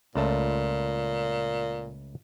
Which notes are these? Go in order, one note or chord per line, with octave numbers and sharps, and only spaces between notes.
C#2 A#2 A3 A5